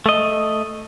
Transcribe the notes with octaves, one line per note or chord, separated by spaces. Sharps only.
A3 D#5